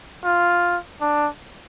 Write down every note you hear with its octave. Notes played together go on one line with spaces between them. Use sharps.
F4
D4